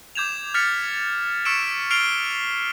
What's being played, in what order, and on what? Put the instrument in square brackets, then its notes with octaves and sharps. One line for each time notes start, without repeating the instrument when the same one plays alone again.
[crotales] D6 G6 G#6 E7 F7
F6 G#6 A6 B6 C#7 F7
C#6 E6 B6 C#7 D7 E7
F6 C7 D7 F7 G7